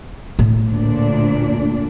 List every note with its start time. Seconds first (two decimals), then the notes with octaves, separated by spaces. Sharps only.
0.39 A2
0.70 D2 A#2 D4